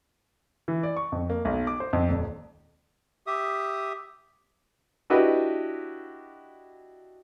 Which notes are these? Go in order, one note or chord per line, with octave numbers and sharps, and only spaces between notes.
E3
D5
C#6
F2
A#3
B1
D6
C5
F2
D#1
G4 E5 D#6
D4 E4 F#4 G4 B4 D#5